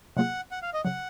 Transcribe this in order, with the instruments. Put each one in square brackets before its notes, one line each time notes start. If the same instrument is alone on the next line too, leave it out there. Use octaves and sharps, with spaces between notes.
[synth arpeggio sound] C3 F#3 A#3 F4 G#4 [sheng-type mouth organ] F#5
[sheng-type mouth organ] F#5
F5
D#5
[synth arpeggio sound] C#3 F#3 [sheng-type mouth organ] F#5